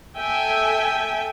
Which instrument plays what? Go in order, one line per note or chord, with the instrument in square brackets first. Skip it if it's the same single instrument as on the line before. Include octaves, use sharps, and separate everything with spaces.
[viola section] A4 E5 G5 G#5